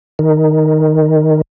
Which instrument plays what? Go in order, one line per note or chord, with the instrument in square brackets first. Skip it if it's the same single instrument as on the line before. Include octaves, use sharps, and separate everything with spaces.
[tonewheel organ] D#3